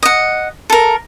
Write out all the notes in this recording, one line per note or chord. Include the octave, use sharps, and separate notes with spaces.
D#5 F#5
A4 A#4